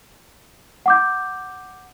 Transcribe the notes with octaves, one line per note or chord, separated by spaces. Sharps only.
F#5 D6 G6